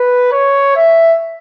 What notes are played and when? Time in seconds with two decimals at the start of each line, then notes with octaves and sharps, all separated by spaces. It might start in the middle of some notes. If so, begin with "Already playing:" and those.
Already playing: B4
0.32 C#5
0.76 E5